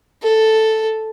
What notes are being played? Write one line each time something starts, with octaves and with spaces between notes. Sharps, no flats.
A4